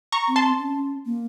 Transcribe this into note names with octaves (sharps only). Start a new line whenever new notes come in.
A#5 C#6
C4
A5 C6
C#4
A#3